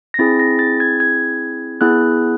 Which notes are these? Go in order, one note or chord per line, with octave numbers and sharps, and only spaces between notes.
A#6
C4 E4 G#4 A6
A#6
A6
G#6
G#6
B3 E4 G#4 F#6